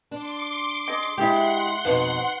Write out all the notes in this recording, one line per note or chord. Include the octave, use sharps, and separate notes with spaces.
D4 C6 D6
G#4 D#5
G#3 E4 G4 G#4 E5 F#5 C6
F2 B2 D#4 B4 F5